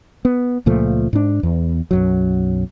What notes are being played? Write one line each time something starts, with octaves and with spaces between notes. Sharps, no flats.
B3
C#2 A#2 F3 A3
G#2 D4
E2
B1 F#2 F#3